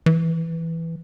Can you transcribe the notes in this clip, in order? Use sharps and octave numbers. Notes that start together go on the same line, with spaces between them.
E3